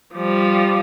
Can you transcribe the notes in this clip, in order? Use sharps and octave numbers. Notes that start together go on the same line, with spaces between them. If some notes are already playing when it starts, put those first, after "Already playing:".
F3 G3